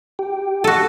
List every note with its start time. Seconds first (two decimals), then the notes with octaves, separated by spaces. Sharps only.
0.19 G4 G5
0.64 F#4 A4